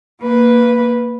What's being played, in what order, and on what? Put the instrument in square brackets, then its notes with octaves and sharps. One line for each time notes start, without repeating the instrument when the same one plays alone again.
[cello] A#3 B4